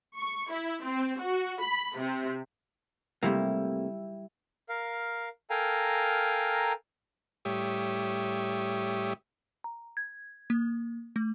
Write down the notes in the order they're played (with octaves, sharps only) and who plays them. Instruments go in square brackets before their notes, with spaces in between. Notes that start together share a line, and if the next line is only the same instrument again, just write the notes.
[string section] C#6
E4
C4
F#4
B5
C3
[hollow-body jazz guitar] C3 A3 A#3 [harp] G3 E4
[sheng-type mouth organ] A#4 F5
A4 A#4 F5 G5 G#5 A#5
[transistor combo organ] A2 G3 G4 C#5 E5 D#6
[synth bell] A#5
G#6
A#3
A3